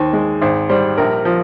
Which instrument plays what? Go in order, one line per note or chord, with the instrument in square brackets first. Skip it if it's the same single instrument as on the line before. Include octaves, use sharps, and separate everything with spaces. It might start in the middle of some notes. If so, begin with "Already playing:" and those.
Already playing: [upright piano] D#2 D#3 C5
G#3
G#1 C5
G3 C5
A#1 A#4
F3